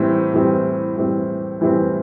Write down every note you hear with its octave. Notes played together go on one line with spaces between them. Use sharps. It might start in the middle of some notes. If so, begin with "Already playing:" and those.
Already playing: A2 E3 G3 C4
A2 E3 G3 C4
A2 E3 G3 C4
A2 E3 G3 C4